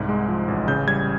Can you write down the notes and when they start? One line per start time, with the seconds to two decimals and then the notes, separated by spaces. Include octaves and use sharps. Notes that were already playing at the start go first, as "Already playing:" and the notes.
Already playing: C2 G#2
0.09 G#3
0.29 F3
0.48 A1
0.68 C#3 G6
0.88 G3 G#6